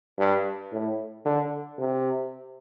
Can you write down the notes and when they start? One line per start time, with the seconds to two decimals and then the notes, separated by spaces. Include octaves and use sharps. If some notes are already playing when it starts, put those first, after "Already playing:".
0.19 G2
0.72 A2
1.25 D3
1.78 C3